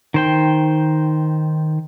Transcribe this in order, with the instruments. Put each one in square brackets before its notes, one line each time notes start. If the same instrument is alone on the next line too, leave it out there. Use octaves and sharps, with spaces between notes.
[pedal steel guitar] D#3 C5 G5